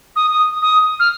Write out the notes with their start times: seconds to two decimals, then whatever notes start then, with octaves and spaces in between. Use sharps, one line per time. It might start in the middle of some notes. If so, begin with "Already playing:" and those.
0.16 D#6
0.31 D#6
0.62 D#6
1.00 F6